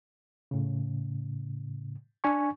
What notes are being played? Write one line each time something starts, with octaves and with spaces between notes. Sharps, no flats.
A2 C#3
D4 G#5 C#6